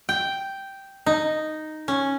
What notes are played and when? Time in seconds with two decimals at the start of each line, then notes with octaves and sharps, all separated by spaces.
0.09 G5
1.06 D#4
1.88 C#4